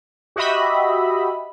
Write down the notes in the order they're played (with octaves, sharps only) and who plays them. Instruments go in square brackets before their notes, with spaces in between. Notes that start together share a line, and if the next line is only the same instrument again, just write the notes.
[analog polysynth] F#4 G4 D#5 E5 B5